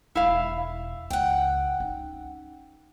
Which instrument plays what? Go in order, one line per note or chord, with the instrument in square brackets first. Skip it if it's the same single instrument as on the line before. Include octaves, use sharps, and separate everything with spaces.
[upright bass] E1 G#3 [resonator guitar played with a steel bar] E4 F5
[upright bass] C#2 [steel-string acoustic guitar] F#5 G5
[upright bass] C#4 D#4